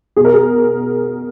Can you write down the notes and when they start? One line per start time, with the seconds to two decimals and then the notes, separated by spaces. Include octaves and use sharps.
0.16 B2 G#4
0.25 A#4
0.34 G#4